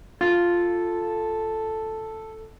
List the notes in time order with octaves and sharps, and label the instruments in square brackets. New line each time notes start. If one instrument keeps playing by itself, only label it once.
[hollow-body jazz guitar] F4 [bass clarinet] A4